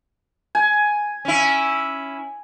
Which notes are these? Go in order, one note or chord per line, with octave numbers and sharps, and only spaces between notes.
G#5
C#4 E4